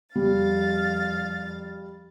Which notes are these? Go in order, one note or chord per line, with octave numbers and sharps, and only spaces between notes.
F2 G3 F5 A6